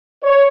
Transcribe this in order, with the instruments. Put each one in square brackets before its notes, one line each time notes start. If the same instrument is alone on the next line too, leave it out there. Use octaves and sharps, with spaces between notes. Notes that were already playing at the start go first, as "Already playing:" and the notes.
[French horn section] C#5